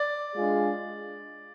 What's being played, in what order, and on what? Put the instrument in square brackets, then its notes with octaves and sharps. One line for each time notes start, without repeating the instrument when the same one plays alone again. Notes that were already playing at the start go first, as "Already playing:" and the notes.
Already playing: [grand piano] D5
[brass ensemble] G#3 D4 F4 G#4